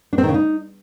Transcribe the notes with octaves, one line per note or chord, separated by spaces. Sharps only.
D4
C4
D#3
C#3
D#4